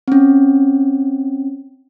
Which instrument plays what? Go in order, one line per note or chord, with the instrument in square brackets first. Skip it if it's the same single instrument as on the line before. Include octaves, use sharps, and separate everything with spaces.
[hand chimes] C4 C#4